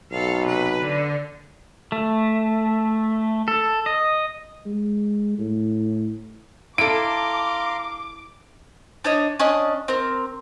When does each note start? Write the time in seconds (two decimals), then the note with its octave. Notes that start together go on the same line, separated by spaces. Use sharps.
0.11 B1 A4 F5
0.47 C3 B4
0.80 D3
1.92 A3
3.48 A4
3.86 D#5
4.66 G#3
5.39 A2
6.78 E4 A4 F5 A#5 C6 D6 D7
9.04 D4 C#5 D#5
9.40 C#4 D4 D#5
9.88 C4 A#4